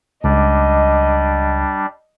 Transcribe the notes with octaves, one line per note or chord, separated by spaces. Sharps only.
C#2 G3 D4 D#5